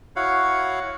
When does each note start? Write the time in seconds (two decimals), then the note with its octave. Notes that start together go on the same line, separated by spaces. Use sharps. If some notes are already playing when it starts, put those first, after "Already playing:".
0.16 E4 F#4 C#5 F5 F#5